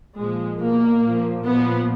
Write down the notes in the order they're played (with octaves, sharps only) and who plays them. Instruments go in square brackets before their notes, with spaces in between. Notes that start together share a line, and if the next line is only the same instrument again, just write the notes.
[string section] A#2 F3 G#3
B2 A#3
A#2 F3
A#2 F3 B3